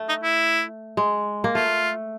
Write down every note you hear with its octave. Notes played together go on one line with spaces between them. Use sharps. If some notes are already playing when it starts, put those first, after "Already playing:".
Already playing: A3
D#4
E4
G#3
A#3
A3 F4